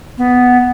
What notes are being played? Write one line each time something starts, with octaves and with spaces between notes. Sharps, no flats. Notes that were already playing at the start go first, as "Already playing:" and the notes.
B3